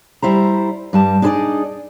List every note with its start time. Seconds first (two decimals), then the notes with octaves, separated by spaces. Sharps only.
0.22 G3 E4 C5 A#5
0.93 G2 G3 A5
1.22 D4 D#4 G#4 C5 D5 D#5